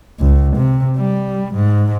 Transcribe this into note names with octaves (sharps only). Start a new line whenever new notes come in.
C#2
C3
G3
G#2